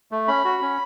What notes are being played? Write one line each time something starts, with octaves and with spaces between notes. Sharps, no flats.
A3
C#4 B5
F#4
C#4